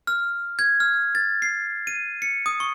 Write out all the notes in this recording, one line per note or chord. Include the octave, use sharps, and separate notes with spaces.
F6
G#6
F6
A6
C7
D#7
C#7
D#6
C#6